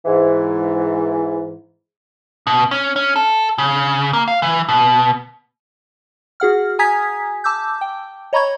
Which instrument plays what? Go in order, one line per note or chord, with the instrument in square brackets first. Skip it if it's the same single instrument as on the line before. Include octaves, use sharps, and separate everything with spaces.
[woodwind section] G#2 E3
[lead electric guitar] B2
C#4
C#4
A4
C#3
A#3
F5
E3
B2
[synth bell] F#4 G#4 F#5 F6
G#5 A#5 D#6 G#6 B6
A5 D6 E6 G6
G5
C#5 D#5 A#5 B5 C#6 G#6